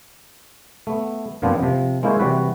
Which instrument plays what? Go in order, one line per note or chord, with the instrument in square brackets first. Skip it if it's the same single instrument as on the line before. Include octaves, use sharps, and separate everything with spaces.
[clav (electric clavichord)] A3 B3
F#2 A#2 F3 B3 C4 D4
C3 F3
G#3 A#3 E4 A#4 C5 C#5
C3 E3 G3 F#4 B4